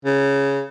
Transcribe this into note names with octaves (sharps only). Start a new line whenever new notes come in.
C#3